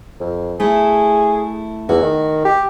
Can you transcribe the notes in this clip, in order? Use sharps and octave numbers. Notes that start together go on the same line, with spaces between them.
F2
A3 E4 G#4
E2 F#4
D#3
G4